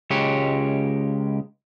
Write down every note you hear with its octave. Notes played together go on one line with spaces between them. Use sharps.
C#2 G#3 G4 C#5